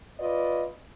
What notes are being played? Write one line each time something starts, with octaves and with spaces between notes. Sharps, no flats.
F4 B4 D5 D#5